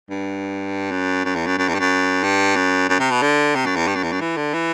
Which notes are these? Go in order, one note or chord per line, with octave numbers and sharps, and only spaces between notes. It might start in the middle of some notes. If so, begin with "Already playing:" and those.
G2
F#2
F#2
E2
F#2
F#2
E2
G2
F#2
G2
F#2
F#2
C3
B2
D3
C3
F#2
E2
G2
F#2
E2
F#2
E3
D3
E3